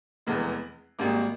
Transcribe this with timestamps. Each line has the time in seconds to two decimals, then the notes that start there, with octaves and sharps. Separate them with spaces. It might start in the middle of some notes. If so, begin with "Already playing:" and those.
0.27 F1 E2 E3 G#3
0.99 G#1 G#2 G3 A#3